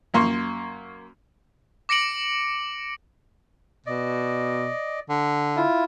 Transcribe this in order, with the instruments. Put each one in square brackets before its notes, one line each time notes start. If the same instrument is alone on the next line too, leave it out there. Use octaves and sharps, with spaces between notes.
[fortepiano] F#2 A#3 C6 C#6
[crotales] D6 A#6 C#7 D7 F#7
[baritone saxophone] B2 [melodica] D5 D#5
[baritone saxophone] D3
[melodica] E4 F4